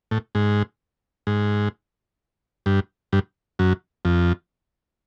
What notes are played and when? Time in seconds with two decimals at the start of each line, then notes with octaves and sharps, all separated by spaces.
0.11 A2
0.35 G#2
1.27 G#2
2.66 G2
3.13 G2
3.59 F#2
4.05 F2